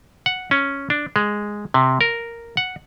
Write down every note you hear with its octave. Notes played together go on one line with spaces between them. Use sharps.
F#5
C#4
D4
G#3
C3
A#4
F#5